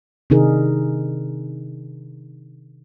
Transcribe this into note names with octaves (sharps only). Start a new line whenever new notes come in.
C3 D#3 D4 D#4 G#4 A#4